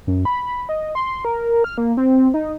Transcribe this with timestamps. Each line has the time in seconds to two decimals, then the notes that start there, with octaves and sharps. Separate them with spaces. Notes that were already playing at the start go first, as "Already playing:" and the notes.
0.07 F#2
0.25 B5
0.69 D#5
0.95 C6
1.25 A#4
1.64 F6
1.78 A#3
1.97 C4
2.34 D#4